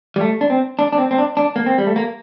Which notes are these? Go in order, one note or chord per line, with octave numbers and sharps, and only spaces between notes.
G3
A3
D4
C4
D4
D4
C4
C4
D4
D4
A#3
C4
G3
A3
A#3